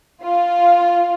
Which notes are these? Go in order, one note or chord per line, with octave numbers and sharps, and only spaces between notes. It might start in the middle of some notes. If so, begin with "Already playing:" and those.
F4